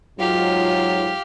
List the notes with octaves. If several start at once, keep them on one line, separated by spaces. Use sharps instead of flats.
G#2 F#3 F4 G4 F5